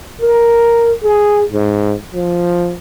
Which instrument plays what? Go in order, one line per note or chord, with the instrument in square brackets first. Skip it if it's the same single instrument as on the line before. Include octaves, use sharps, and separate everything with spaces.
[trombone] A#4
G#4
G#2
F3